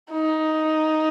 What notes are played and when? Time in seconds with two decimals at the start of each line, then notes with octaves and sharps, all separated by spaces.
0.12 D#4